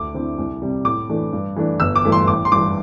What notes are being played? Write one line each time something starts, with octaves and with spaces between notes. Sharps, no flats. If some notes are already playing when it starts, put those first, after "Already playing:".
Already playing: D2 D6
D3 C4 E4
C2
C3 G3
A2 D6
E3 A3 D4
G2
E3 A3 D4
G1 E6
D6
G2 E3 A3
C6
A1 D6
C6
G2 E3 D6